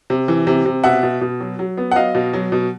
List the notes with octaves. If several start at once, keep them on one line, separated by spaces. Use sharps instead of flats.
C3
E3
C3
C3
B2 E5 F#5
B2
B2
F#3
F#3
B3
F#5
F#3 D#5 F5
B2
F#3
B2